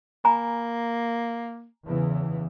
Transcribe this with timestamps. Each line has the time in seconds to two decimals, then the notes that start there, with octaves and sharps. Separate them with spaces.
0.25 A#3 G#5 A#5 B5
1.87 E2 C#3 E3